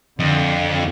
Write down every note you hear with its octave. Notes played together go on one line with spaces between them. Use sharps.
F2 D3